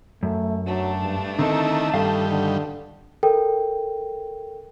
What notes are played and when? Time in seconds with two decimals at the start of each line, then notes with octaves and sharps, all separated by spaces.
0.23 F#2 A3
0.67 F#3 A3 D4
1.03 G2
1.39 D3 D#3 C4 D#4 E4 A4 A#4
1.94 G2 D#3 G3 A4 F5
2.30 D3
3.23 A4 A#4 G5